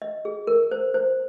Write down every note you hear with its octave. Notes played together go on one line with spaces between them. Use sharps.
D#5
G#4
A#4
C5
C5